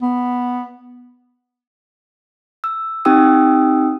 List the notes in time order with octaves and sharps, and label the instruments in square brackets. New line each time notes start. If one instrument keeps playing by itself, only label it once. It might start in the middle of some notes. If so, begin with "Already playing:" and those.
[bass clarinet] B3
[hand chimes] E6
C4 D#4 G4 G5 D#6 E6